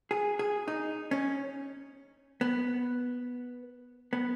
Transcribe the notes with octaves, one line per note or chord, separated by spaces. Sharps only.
G#4
G#4
D#4
C#4
B3
B3